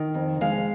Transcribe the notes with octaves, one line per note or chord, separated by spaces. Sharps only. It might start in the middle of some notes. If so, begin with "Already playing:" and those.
Already playing: D#3
F2
G#3 F5